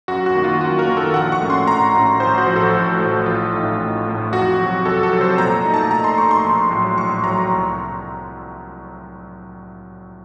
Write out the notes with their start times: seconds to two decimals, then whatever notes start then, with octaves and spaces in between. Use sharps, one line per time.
0.08 F#2 F#4
0.26 F#4
0.35 D#3 A#3
0.44 F4
0.61 F#2 F#4
0.79 A#4
0.88 D#3 A#3
0.97 A4
1.14 A#1 F#5
1.32 C#6
1.41 A2 A3 C#4
1.50 C6
1.67 A#1 A#5
1.94 A2 A3 C#4
2.20 A1 C5
2.38 F#4
2.47 A2 F3
2.56 A4
2.73 A1
2.99 A2 F3
3.26 A1 F4
3.53 A2 A3 D#4
3.79 A1
4.06 A2 A3 D#4
4.32 F2 F#4
4.59 C3 F#3
4.85 F2 A4
5.03 A4
5.12 C3 F#3
5.21 C5
5.38 A#2 A#5
5.65 A3 D#4
5.74 A5
5.91 A#2 A#5
6.04 C6
6.18 A3 D#4 C#6
6.31 C6
6.44 A#1
6.71 A2 F#3
6.97 A#1 C#6
7.24 A2 F#3 A#5
7.50 C2